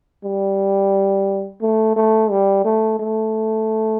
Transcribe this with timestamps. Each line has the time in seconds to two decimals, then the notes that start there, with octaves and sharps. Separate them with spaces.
0.24 G3
1.62 A3
1.96 A3
2.31 G3
2.64 A3
3.00 A3